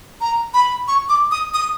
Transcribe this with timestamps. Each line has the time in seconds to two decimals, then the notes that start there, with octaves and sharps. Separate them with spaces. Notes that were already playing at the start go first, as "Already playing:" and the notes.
0.21 A#5
0.54 B5
0.88 C#6
1.09 D6
1.31 D#6
1.54 D#6